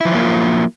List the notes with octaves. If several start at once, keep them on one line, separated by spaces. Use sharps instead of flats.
F3 F#3 A#3 E4 F4